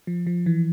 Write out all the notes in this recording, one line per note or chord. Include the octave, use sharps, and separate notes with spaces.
F3
F3
E3